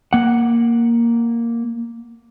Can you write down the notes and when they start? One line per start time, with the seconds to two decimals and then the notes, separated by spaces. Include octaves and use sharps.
0.13 A#3 F#5